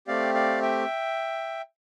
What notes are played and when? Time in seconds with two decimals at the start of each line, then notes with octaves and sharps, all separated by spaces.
0.07 A3 C4 G4 D5 F5
0.35 D5 F5
0.62 E5 G5